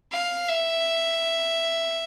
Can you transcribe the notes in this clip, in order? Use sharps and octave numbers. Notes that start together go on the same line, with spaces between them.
F5
E5